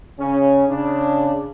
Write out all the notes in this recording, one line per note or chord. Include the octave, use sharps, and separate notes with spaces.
C#3 C#4
C#3 D4